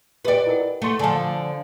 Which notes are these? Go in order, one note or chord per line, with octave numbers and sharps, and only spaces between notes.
G4 B4 D5 D#5 G5
E4 A#4 F#5
A3 F#5 C6
D3 F3 F#5 G#5 A5